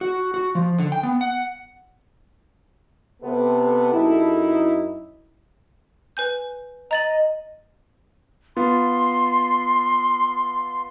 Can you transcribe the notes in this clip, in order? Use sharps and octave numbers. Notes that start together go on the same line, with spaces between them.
F#4
F#4
F3
D3
G5
B3
F#5
C3 B3 G4 A4
F#2 D#4 E4
B4 G#5 G6
D#5 A#5 A6 F#7
B3 F4 C6